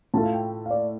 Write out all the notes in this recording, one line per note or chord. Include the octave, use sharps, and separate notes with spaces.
A2 A3 F4 A4 A5
F5
G5
F5
D5